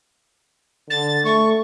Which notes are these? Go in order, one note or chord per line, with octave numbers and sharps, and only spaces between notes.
D3 A6
A3 C#6